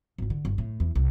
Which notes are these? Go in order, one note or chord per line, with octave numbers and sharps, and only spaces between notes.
G#1 E4
D3
G1
A2
E2
C2